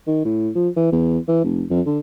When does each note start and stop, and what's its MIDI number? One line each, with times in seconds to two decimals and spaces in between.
0.07 0.22 51
0.25 0.50 45
0.55 0.69 53
0.76 0.91 52
0.92 1.18 40
1.28 1.40 52
1.44 1.64 29
1.70 1.81 41
1.86 1.99 50